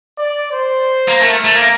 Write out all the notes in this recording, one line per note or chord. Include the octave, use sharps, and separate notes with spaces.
D5
C5
A#3
A3 A#4
A3
A#3